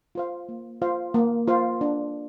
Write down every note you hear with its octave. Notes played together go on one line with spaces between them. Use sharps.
F4 C5 F5
A#3
F4 C5 F5
A#3
F4 C5 F5
D4